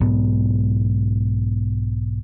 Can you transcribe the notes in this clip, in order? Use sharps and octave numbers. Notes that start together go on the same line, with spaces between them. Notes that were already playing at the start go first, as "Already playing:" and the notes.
B1 G#2 B3